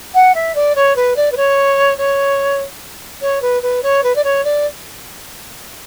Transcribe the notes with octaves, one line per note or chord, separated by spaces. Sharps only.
F#5
E5
D5
C#5
B4
D5
B4
C#5
C#5
C#5
B4
B4
C#5
B4
D5
C#5
D5